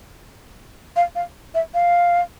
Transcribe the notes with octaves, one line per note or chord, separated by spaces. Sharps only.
F5
F5
E5
F5